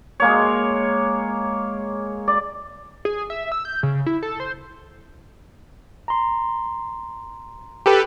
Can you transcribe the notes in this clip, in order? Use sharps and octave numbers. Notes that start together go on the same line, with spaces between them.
G#3 A#3 C#5
D5
G#4
E5
E6
G6
C#3
E4
A4
C5
A#5 C6
G4 A4 B4